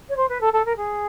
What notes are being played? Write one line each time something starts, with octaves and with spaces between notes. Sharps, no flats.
C#5
C5
B4
A4
A4
A#4
G#4